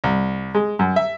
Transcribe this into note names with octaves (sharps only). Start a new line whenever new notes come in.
C2
G#3
F#2
E5